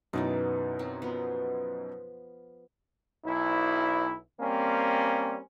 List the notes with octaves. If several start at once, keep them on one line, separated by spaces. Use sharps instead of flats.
F#2 B2 E3 F#3 D#4 D5
F#3 C4
F3 B3
B1 E4
G3 A#3 C4 C#4